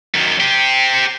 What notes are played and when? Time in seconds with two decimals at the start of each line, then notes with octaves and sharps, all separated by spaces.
0.14 F#2 D#3
0.40 C4 G4